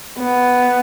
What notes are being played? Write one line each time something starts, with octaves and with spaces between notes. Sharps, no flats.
B3